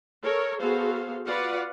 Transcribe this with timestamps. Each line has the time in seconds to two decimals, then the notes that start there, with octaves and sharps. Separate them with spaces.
0.24 A4 A#4 C#5
0.60 B3 F#4 G#4 A4 C5 F5
1.26 F4 F#4 B4 D5 F5 F#5